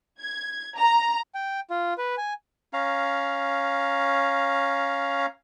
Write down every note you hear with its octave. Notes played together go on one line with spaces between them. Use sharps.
G#6
A#5
G5
F4
B4
G#5
C#4 F5 A#5